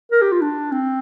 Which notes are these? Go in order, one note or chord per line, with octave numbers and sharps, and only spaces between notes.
A#4
G4
F4
D4
C4